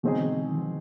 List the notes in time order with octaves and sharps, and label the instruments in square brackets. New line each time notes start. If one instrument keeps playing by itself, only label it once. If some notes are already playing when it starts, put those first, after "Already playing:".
[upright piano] B2 G#3 C4 D#4 G#4 [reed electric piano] D3 E3
[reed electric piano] D#3 F3